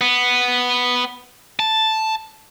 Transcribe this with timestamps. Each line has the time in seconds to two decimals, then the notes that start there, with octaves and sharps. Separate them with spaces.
0.01 B3
1.60 A5